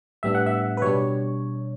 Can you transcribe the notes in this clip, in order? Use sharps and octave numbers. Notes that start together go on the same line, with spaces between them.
A2 G3 B3 D4 E5
F#5
E5
B4
B2 G3 D4 C#5